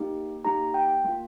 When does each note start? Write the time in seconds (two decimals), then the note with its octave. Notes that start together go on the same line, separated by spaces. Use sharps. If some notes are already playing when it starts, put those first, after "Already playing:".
Already playing: A#3 D#4 G4
0.45 A#3 D#4 G4 A#5
0.74 G5
1.05 A#3 F4